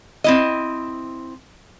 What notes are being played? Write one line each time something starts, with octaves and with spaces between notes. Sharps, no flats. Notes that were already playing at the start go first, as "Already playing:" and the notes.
C4 E4 D#5